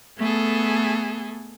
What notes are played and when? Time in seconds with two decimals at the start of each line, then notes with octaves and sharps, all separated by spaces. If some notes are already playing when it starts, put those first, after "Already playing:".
0.18 A3 B3 G#4 A4